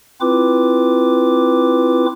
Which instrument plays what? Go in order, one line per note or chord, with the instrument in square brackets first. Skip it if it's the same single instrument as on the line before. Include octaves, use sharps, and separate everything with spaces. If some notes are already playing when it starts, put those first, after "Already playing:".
[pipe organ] C4 E4 F4 B4 D6